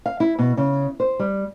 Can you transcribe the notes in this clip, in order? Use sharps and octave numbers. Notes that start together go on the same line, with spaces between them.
F5
E4
B2
C#3
C5
G3